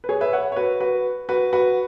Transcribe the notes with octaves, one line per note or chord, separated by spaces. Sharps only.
B4
G#4 C#5
B4 E5
C#5 F#5
C#5
F#4 B4
F#4 B4
F#4 B4
F#4 B4